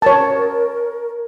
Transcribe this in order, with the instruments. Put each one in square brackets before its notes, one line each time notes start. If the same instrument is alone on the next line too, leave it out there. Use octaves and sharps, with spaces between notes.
[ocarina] A#4 [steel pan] C#5 A5